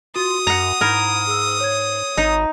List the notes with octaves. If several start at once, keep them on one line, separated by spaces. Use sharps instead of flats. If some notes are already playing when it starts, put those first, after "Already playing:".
F4 F#4 D#6
F#2 F#5 A#5
G#2 E4 A#4 B5 G#6
G#4 E6
C#5 G#6
G#1 D#4